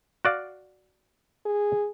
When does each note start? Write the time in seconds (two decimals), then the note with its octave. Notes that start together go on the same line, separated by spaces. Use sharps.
0.25 F#4 D5 F5
1.46 G#4